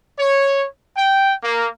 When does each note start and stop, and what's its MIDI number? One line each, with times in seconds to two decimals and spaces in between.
0.19 0.66 73
0.96 1.33 79
1.44 1.68 58